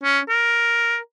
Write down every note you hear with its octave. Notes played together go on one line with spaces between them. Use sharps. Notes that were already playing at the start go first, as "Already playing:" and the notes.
C#4
A#4